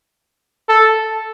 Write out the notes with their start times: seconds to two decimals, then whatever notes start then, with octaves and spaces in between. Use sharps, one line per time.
0.69 A4